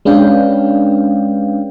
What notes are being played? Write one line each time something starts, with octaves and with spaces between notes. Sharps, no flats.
G#3 C#4 D4 B4 F5 G5